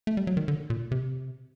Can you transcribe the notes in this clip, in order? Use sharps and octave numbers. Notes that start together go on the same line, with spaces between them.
A3
G3
F#3
D#3
D3
A#2
C3